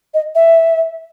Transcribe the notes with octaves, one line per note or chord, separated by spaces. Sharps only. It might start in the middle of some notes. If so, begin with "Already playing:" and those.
D#5
E5